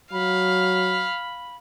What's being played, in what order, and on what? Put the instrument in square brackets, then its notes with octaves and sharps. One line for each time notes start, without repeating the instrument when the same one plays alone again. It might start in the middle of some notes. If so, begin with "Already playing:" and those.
[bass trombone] F#3 [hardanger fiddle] F5 [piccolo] B5